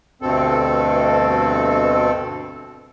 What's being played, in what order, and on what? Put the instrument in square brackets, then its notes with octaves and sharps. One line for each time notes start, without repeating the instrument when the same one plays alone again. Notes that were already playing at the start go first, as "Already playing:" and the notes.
[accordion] D2 G2 B2 C4 A4